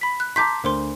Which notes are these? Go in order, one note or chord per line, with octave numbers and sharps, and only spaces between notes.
B5 B6
F#6
A5 A#5 C6 D6 G6 B6
D2 A#4 C5 C6